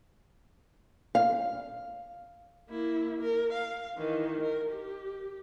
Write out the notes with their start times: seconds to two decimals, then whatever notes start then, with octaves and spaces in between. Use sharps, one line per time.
1.15 F5
2.70 A#3 E4
3.21 A#4
3.53 F5
3.96 D#3 E3
4.41 A#4
4.72 G4